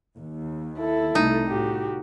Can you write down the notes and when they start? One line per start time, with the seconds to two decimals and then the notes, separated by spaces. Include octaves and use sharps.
0.17 D#2
0.79 E4 A4
1.15 C2 A3 D#4
1.47 A2 F#4 G4